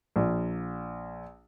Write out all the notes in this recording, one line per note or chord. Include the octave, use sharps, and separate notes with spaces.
A#1